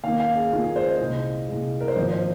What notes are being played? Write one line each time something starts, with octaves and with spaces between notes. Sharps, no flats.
D#2 D#3 A#3 F5
F5
G#4
D#2 D#3 A#3 F4
G#4
C5
D#5
C2 A#2 G#3
C2 A#2 G#3
A#4
C5
G#1 G#2 F3 A#3 D#5
C5